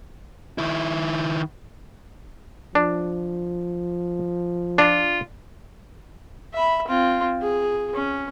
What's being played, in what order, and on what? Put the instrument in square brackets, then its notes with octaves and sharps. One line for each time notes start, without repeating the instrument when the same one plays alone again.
[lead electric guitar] D#3 E4
[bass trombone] F3 [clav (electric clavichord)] D4
[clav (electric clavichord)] D4 [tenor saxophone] F4
[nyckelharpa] E5 B5
C4 F4
G#4
C#4